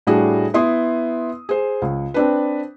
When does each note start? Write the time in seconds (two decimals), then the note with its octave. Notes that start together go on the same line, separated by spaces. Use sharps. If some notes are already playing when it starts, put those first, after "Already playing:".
0.07 A2 G3 D4 F#4 G#4
0.54 B3 E4 C6 D#6
1.49 G#4 C5
1.82 C#2
2.14 C4 D4 B4